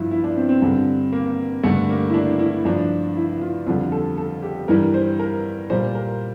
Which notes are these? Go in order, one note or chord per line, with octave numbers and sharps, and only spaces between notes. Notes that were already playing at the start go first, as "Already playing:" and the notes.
Already playing: G2 F3 E4 F4
E4
D4
C4
C4
G2 D3 G3
A#3
G2 D3 G3 A3
A#3
E4
D4
E4
G2 F3 D4
E4
F4
F2 D3 G3 F4
A4
A4
G4
G2 E3 G3 A#4
C5
A#4
A#2 G3 C5
A#4